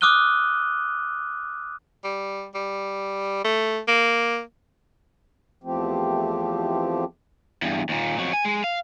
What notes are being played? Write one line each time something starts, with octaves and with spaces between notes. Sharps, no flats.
D6 D#6 F6 F#6 D#7 G7
G3
G3
A3
A#3
E2 F3 A3 C4 G4
E2 G2
D#2 A#2
F2 F#3
G#5
G#3
F5